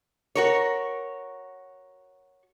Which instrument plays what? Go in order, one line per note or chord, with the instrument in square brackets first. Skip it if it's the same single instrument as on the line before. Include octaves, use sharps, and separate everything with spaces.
[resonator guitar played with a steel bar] F#4 A#4 C#5